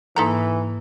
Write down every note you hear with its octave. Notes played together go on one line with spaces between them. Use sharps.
G#2 E3 A#3 D#4 A4 A#5